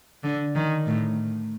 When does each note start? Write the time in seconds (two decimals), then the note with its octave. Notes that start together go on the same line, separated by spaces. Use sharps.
0.24 D3
0.55 D#3
0.87 A2